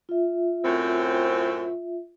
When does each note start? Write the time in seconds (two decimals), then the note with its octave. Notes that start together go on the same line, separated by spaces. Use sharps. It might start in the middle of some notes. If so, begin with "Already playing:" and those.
0.09 F4 E5
0.64 F#2 A2 C4